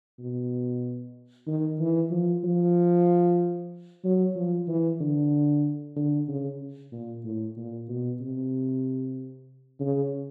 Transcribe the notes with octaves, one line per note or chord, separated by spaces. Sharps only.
B2
D#3
E3
F3
F3
F#3
F3
E3
D3
D3
C#3
A#2
A2
A#2
B2
C3
C#3